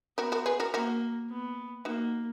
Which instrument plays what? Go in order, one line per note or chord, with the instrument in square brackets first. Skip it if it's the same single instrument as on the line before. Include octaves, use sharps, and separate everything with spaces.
[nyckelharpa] B3 [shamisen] F#4 A#4
[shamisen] F#4 A#4
G#4 B4
F#4 A#4
[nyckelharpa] A#3 [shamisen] F#4 A#4
[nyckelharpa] B3
[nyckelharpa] A#3 [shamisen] D#4 F#4